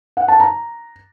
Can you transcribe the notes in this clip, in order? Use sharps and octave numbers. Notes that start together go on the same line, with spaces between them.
F#5
A5
A#5